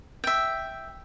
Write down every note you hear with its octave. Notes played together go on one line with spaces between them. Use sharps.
E5 G5